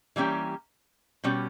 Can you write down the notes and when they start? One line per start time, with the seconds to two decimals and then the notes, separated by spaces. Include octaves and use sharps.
0.16 E3 G3 A#3 C#4 G4
1.24 B2 G3 C#4 G4